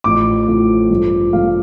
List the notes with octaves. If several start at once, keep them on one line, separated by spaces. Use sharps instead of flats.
A1 A2 F3 D6
A1 A2 F3
G2 F3 A3
G2 F3 A3 F5